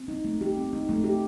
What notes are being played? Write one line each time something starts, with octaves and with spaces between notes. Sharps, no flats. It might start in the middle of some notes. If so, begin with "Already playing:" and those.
Already playing: C4
D#4
A3
G4
C4
D#4
A3
G4